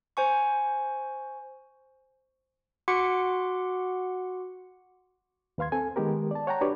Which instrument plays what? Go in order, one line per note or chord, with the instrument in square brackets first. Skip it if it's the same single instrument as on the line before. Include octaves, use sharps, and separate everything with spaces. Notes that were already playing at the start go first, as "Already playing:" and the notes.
[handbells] C5 G#5 C#6
F#4 F#5 C6 D6 C#7
[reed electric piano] D#2 B4 F5 C6 G#6
C4 A4 G#5
D#3 G#3 B3 G4 A#4
D5 A5
C#5 F#5 G5 A5 A#5
D4 F#4 G4 B4 C#5 D5